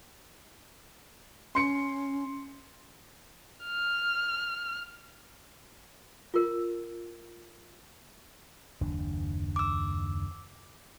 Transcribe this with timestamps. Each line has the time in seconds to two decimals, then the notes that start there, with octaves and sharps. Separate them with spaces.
1.55 C#4 C6 C#7
3.65 F6
6.34 F4 A#4
8.81 F#1 D#2 D4
9.56 D6 E6